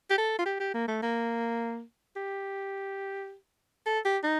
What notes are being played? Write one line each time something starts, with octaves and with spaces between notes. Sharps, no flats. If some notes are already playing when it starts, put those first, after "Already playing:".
G4
A4
F4
G4
G4
A#3
A3
A#3
G4
A4
G4
D#4